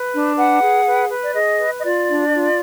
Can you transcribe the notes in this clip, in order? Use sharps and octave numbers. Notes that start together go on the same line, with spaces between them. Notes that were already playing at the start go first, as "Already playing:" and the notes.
Already playing: B4
D4
B4 F#5
G#4
B4
B4
D5
G#4 D#5
B4
D#5
F4 D5
D4
F4